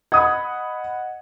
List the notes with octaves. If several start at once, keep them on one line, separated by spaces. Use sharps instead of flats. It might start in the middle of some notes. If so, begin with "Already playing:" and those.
D#5 F#5 B5 D#6 G#6